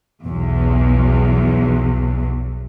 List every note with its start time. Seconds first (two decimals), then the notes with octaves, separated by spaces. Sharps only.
0.23 B1 E2